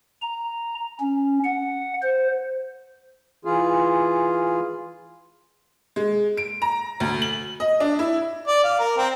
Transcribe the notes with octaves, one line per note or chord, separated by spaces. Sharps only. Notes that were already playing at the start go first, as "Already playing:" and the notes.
A#5
C#4
F#5
C5
E3 F4 G#4
G#3
D7
A#5
D2
F#7
D#5
D4
E4
D5
F5
A#4
C4